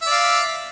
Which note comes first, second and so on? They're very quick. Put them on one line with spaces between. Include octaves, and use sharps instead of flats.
E5 D5 F5